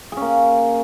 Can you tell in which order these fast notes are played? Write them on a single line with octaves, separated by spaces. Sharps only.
G#4 C#4 A#3